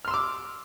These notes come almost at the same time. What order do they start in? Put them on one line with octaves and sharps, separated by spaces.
F6 C6 E6 D6